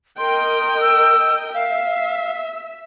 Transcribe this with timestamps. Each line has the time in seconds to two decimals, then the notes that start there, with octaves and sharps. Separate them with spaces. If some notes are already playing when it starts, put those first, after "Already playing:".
0.18 A#4 D#5 G5 C6
0.80 E6
1.54 E5 F5